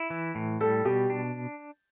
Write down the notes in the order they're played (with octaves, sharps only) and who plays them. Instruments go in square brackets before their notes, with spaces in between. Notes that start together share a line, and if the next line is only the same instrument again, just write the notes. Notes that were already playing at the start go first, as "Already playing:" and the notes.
Already playing: [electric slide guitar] E4
E3
A2
[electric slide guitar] G3 [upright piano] A4
[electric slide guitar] B2 [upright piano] G4
[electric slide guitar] D4